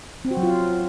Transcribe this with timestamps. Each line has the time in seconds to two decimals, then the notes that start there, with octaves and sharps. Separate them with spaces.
0.25 C4
0.31 F#4
0.37 F#3
0.43 F4